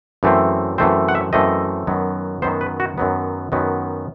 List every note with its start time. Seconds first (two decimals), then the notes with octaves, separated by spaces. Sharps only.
0.23 F#2 E3 A3 C4
0.78 F#2 E3 A3 C4 C5
1.09 F#5
1.15 E5
1.33 F#2 E3 A3 C4 D#5
1.87 F#2 D#3 F#3 B3
2.42 F#2 D#3 F#3 B3 C5
2.61 B4
2.80 F#4
2.98 F#2 D#3 F#3 B3
3.52 F#2 D#3 F#3 B3